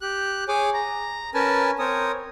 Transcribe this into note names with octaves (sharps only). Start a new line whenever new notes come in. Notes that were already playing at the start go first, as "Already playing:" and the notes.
G4 F#6
G#4 C#5 G#5 D6
A#5
C#4 A#4 B4 G#5 A5
C4 A#4 C#5 D#6